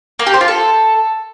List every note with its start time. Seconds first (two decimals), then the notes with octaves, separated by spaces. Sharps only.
0.19 A#3
0.27 G4
0.34 C5
0.41 F4
0.48 A4